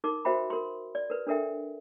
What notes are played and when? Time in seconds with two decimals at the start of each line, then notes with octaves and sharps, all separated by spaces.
0.04 D#4 A#4 D6
0.25 F#4 A#4 C5 E5 G5 B5
0.50 A#4 C6
0.95 D5
1.10 A#4 B4
1.27 D4 A4 A#4 E5 G5